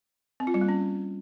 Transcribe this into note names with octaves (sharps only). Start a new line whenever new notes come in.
C4
F4
G3
A#3
C#4